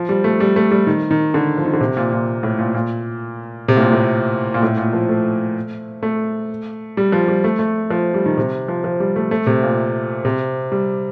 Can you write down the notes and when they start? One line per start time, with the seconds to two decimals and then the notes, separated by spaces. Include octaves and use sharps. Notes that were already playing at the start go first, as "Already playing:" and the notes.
Already playing: F3
0.09 G3
0.24 A3
0.40 G3
0.56 A3
0.71 G3
0.87 D#3
1.11 D#3
1.34 D3
1.57 F3
1.65 D#3
1.73 D3
1.81 C3
1.97 A#2
2.12 A#2
2.43 A2
2.59 A#2
2.74 A#2
3.68 C3
3.77 A2
3.80 A#2
3.92 A2
4.54 A#2
4.62 A2
4.77 A#2
4.93 F3
5.09 A3
6.03 A3
6.97 G3
7.12 F3
7.28 G3
7.44 A3
7.59 A3
7.90 F3
8.14 G3
8.26 D#3
8.37 C3
8.68 F3
8.84 F3
9.00 G3
9.16 A3
9.31 A3
9.47 C3
9.63 A#2
10.25 C3
10.72 G3